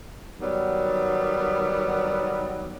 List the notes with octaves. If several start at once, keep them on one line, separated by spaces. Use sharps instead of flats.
D#3 F#3 G3 B3